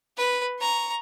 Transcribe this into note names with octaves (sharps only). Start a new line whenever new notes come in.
B4
A#5 C#6